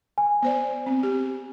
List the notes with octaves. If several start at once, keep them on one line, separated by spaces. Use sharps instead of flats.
G#5
B3 C5 D5
C4
G4